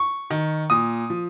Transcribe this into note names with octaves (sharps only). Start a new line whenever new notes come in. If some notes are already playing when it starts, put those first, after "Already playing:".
Already playing: C#6
D#3
A#2 D#6
F3